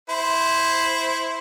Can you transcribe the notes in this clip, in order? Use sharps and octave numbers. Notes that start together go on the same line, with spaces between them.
E4 C5